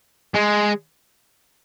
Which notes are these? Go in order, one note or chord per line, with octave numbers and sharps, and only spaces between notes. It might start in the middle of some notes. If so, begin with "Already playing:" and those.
G#3